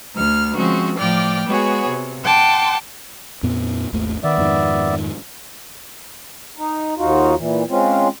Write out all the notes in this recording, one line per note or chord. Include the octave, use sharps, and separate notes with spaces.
D2 F6
F3 G#3 C4 C#4 F#4
A2 F3 D5 G5 D6 F6
G#3 B3 F#4 G#4 C#5
C3
F#5 G5 A5 C6 D6
F2 A#2 B3
G#1 D#2 A3
D#3 B3 D5 E5
F2 G#2 D#3
D#4
D#2 D#4 F4 F#4
A#2 E3
G#3 C4 C#4 F4